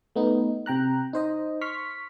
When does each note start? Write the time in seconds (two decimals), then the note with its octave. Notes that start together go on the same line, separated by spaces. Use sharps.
0.16 A3 B3 D#4
0.66 C3 G5 A#5 F#6
1.13 D#4 C5 D#5
1.61 C6 C#6 F6 B6